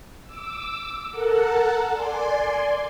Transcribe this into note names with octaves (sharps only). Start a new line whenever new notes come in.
D6 E6
A4 A#4 F#5 A5
D5 G#5 C6